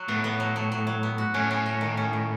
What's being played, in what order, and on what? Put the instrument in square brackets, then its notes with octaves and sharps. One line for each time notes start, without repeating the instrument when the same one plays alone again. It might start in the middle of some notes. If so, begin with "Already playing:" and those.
Already playing: [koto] F#3 F#4
[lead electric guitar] A2 [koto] B3
[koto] B3
F#3
F#3
F#3
F#3
B3
F#4
[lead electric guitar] A2 [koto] C#4
[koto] C#4
C#4
D#3
C#4
D#3